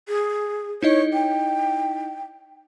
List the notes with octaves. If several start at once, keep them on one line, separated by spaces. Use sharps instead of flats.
G#4
D#4 E4 C#5 D#5
G5